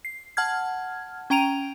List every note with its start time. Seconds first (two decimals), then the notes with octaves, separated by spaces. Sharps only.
0.05 C7
0.37 F#5 A5 F6 G#6
1.30 C#4 G5 A#5 D7 D#7 F7